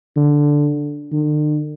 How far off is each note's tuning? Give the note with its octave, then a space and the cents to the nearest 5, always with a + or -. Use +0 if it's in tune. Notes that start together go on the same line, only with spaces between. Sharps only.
D3 +0
D3 +45